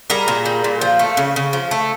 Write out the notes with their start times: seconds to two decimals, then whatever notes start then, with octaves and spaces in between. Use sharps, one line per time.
0.10 G3 G#4 A#4
0.28 A#2
0.45 G3
0.64 A#2
0.81 F3
0.99 A3
1.17 C#3
1.36 C#3
1.53 F3
1.71 A3